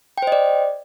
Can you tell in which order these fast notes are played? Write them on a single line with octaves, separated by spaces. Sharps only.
G5 C5 D#5 D5